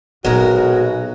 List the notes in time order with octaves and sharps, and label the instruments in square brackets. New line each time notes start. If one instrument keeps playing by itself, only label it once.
[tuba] B1 [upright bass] A#2 E4 [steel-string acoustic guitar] G#3 A#4 [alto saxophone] F#4